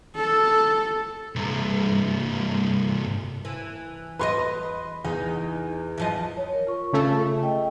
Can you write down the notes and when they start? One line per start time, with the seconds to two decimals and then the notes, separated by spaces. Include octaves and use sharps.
0.16 A4
1.35 C2 G2
3.45 E3
4.19 E2 G4 B4 D#5 C6
5.05 E2 D#4
5.98 E3 F3 D#5
6.37 C#5
6.53 A#4
6.67 F4 C#6
6.93 C#3 A3
7.43 D#5 G5